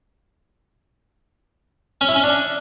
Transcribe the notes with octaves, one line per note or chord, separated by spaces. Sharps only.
C#4
E4
C#4
D4